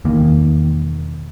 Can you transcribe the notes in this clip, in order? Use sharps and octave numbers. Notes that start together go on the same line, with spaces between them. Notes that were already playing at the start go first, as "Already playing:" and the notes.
E1 D#3 A#3